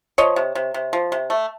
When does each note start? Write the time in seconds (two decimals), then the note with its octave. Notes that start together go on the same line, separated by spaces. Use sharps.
0.18 F3 C#5 D#5
0.36 C3
0.55 C3
0.74 C3
0.93 F3
1.12 C3
1.30 A3